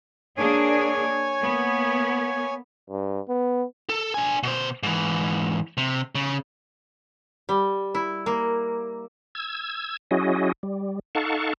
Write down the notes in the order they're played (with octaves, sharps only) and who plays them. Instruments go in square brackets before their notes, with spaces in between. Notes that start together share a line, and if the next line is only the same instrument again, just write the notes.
[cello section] A#3 D4 G#4 [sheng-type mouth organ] C#5 G#5
[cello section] A#3 B3
[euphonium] G2
B3
[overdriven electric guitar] A4
D4 G#5
B2 C5
G#2 E3
C3
C#3
[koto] G3
E4
A#3
[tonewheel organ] E6 G#6
F#3 C#4 E4 F#4 G#4 D#5
G3
D#4 A4 F5 F#5 A5 C#6